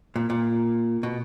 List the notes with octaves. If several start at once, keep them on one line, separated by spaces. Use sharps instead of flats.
A#2
A#2
B2